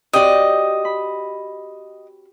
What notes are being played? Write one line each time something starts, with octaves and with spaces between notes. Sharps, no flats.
C4 F#4 G4 D5 D#5 G5
B5